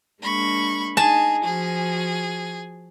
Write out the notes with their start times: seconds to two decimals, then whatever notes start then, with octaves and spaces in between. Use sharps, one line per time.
0.22 G#3 A#3 D4 B5 C#6
0.97 D#4 G#4 G#5 A5
1.43 F3 F#4 G#4